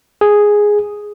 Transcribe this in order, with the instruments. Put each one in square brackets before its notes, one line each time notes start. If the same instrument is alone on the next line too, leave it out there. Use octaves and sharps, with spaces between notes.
[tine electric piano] G#4